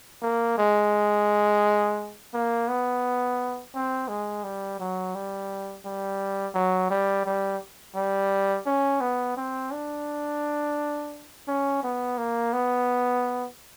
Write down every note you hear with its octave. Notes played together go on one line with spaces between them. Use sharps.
A#3
G#3
A#3
B3
C4
G#3
G3
F#3
G3
G3
F#3
G3
G3
G3
C#4
B3
C4
D4
C#4
B3
A#3
B3